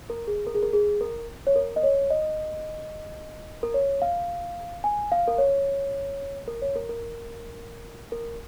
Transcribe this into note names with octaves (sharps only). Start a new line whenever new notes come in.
A#4
G#4
A#4
G#4
A#4
G#4
A#4
C#5
A#4
D#5
C#5
D#5
A#4
C#5
F5
G#5
F5
A#4
C#5
A#4
C#5
A#4
A#4
A#4